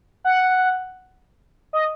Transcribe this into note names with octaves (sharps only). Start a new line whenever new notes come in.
F#5
D#5